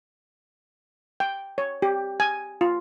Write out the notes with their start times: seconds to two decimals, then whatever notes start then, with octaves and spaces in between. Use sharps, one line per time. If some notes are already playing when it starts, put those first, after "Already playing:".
1.20 G5
1.58 C#5
1.82 G4
2.20 G#5
2.61 F4